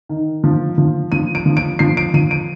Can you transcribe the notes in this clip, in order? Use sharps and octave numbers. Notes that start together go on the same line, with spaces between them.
D#3
F3
F3
F3 D#7
D7
F3
D7
F3 C7
D7
F3 D#7
D7